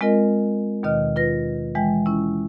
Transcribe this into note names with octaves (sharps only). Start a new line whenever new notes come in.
G#3 C4 F4 A#4 D#5
D#2 B2 D#3 D#5 F6
F4 B4 A#6
E3 G#3 G5
C#4 E4